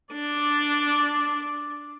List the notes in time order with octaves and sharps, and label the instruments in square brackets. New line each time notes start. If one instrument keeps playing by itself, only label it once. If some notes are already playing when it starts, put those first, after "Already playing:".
[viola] D4 [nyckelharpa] D5